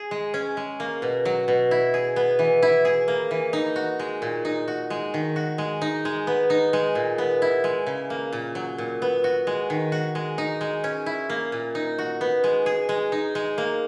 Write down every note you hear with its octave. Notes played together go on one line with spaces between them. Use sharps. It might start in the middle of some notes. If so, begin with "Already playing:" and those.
Already playing: G#4
G#3
C#4
G#3
A#3
B2
F#3
B2
E4
G#4
B3
E3
E4
G#4
A#3
E3
D#4
F#4
G#3
A#2
D#4
F#4
G#3
D#3
F#4
G#3
D#4
G#3
B3
D#4
G#3
A#2
B3
E4
G#3
C#3
A#3
A#2
F#3
A#2
B3
F#4
G#3
D#3
F#4
G#3
D#4
G#3
C#4
E4
A#3
A#2
D#4
F#4
B3
G#3
G#4
G#3
D#4
G#3
A#3